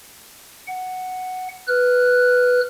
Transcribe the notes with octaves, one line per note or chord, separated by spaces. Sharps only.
F#5
B4 F6 F#6